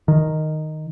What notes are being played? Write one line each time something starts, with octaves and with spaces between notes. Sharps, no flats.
D#3